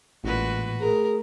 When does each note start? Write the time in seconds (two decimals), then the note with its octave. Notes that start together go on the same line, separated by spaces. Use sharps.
0.24 A1 A#2 G#3 F#4 B4
0.81 A3 G#4 A#4